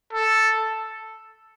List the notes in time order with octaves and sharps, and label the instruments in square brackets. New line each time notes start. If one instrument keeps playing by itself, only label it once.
[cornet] A4